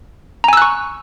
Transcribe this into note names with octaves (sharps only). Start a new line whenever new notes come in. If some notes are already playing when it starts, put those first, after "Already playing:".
G#5 A#5 C#6 E6 F#6